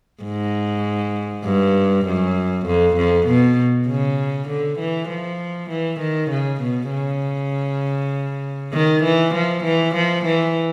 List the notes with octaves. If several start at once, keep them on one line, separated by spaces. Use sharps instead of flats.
G#2
G2
F#2
F2
F2
B2
C#3
D3
E3
F3
E3
D#3
C#3
B2
C#3
D#3
E3
F3
E3
F3
E3